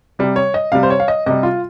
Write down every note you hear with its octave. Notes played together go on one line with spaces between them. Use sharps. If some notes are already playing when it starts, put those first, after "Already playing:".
C3 G3
C#5
D#5
C3 G3 F5
C5
C#5
F5
D#5
C3 G3 D#5
F4